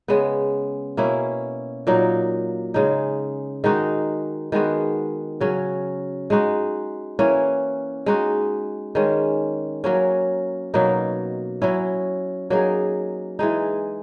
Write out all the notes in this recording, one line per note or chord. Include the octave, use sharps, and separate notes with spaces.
C#3 G#3 B3
B2 A#3 C#4 E4
A#2 F#3 A#3 D#4
C#3 G#3 D#4
D#3 G#3 D#4 F#4
D#3 G#3 B3 F#4
C#3 F#3 C#4
G#3 D#4 F#4
E3 A#3 C#4
G#3 D#4 F#4
D#3 G#3 C#4
F#3 A#3 C#4
B2 F#3 A#3 D#4
F#3 C#4 E4
F#3 A#3 D#4 G#4
E3 G#3 D#4